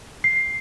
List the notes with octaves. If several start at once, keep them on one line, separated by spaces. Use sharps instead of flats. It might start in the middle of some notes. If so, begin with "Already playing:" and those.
C7